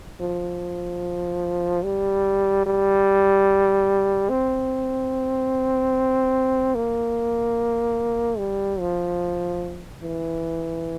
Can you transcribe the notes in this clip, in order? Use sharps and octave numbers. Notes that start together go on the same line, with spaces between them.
F3
G3
G3
C4
A#3
G3
F3
E3